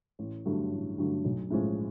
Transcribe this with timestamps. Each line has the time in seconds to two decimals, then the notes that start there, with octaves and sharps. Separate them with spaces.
0.19 A1
0.45 G2 D3 F#3 A3
0.72 A1
0.98 G2 D3 F#3 A3
1.25 B1
1.50 A2 F3 G#3 C#4